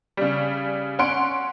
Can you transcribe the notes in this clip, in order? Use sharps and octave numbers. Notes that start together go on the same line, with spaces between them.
C#3 G3
C#4 F#5 C6 D7